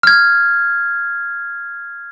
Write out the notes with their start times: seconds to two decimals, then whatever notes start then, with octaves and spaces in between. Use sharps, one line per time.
0.03 F6 G#6